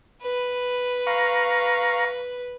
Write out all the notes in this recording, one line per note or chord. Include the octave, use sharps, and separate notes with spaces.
B4
F5 A#5 C#6